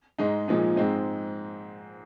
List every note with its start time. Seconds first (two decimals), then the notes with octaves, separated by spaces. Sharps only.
0.18 G#2 G#3 D#4
0.48 A#2 F3 G#3 D#4
0.76 G#2 G#3 C4 D#4